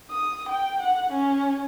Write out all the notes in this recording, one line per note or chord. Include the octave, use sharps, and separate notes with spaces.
D#6
G5
F#5
C#4